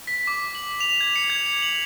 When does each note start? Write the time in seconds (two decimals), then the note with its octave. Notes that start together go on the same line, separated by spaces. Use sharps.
0.07 B6
0.27 D6
0.55 F#7
0.81 F7
1.01 G#6
1.16 C#7
1.30 G#6
1.46 C#7
1.62 F#7